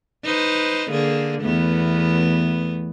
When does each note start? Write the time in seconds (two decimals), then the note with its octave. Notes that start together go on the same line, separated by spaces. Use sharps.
0.24 D#4 B4 C5
0.91 D3 A#3 G#4
1.42 E2 A3 B3